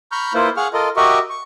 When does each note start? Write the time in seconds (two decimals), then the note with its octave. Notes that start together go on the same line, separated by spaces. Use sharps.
0.12 A#5 B5 C#6 F6 G6
0.34 A#3 E4 F4 B4 C5
0.57 G#4 F5 F#5 C#6 F6
0.73 F4 A4 A#4 D#5
0.97 F#4 G4 A#4 D#5 E5 C#6
1.30 C#6